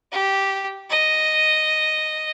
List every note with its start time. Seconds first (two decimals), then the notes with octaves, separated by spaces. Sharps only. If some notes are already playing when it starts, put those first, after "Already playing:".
0.12 G4
0.90 D#5